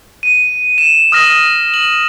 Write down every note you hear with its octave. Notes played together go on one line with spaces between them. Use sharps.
D#7
E7
D#6 F6 A#6 E7 F#7
F#7